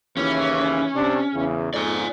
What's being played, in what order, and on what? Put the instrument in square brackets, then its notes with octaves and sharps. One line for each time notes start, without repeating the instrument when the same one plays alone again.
[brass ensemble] D#2 C#3 E3 [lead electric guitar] C#4
[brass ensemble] C3 D4
E2 C#3
[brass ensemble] F2 G#2 [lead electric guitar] D5 G#5